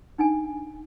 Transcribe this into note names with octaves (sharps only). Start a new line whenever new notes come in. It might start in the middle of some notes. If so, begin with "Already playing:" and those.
D4 D#4 G5 G#5